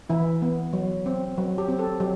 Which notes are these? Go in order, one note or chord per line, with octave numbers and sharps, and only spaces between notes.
E3 E4
B3
F#3
C4
F#3
G4
C4
A4
F#3 G4